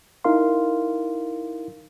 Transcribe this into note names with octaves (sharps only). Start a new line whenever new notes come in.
D#4 E4 A#4 F5 C6